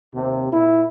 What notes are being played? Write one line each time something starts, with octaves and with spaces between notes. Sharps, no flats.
D#2 C3
A#2 E4